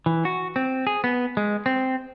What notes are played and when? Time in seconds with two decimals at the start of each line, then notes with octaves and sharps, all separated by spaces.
0.06 E3
0.25 F#4
0.56 C4
0.87 G#4
1.04 B3
1.37 G#3
1.66 C4